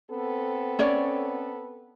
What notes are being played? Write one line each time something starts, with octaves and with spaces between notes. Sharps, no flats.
B3 C4 A4
C#4 C#5 D5